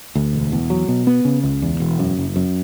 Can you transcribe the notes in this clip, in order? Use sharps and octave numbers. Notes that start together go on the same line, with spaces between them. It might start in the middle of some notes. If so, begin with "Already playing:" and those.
D2
E1
E2
F#3
B2
B3
C#3
C#2
E2
E1
F#2
F#1
F#2